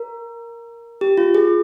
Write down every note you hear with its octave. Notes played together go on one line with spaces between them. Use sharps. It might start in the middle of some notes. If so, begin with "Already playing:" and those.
Already playing: A#4
G4
F4
G#4